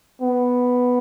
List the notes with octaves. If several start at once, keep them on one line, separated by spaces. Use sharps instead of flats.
B3